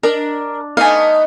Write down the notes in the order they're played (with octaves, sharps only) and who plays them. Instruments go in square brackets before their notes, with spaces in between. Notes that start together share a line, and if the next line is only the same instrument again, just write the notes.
[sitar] D4 [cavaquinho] A#4
[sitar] A3 B3 D#4 [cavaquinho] F5 G#5